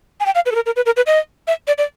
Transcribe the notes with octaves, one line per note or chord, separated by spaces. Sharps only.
G#5
G5
F5
B4
A4
A#4
A#4
B4
A#4
B4
D#5
E5
D5
D5